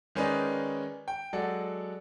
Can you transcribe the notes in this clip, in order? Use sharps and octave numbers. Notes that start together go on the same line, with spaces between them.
D#3 G#3 C#4 D#4 B4 D5
G5
F#3 G#3 A4 D5 F#5